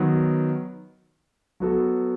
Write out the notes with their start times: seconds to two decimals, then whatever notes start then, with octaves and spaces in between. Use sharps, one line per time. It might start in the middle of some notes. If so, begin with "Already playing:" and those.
Already playing: D#3 F#3 B3
1.60 F#3 B3 F#4 A4